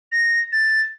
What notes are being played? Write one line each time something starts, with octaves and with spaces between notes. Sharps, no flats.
A#6
A6